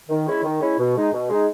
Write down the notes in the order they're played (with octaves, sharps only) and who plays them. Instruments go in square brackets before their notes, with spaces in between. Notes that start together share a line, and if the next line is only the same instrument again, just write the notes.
[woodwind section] D#3
G#3 C#4 E4
D#3
G#3 C#4 E4
B2
G#3 D#4
B2
G#3 D#4